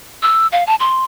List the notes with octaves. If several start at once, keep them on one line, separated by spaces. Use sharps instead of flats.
E6
F5
A5
C6